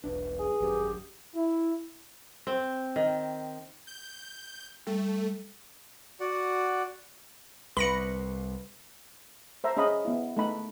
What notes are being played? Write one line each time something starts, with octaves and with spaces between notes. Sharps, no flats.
E1 B1 D4 B4
G#4
G#1 F#2 G4
E4
C4
D#3
G6
G3 A3
F#4 D5 F#5
C2 B4 B5 A#6 C#7
C5 E5 A#5
C#4 G#4 D#5 F5 B5
B3 E4
A3 D#4 B5